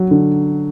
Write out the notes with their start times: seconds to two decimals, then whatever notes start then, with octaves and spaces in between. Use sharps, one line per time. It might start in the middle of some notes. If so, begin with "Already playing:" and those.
Already playing: F#3
0.11 D3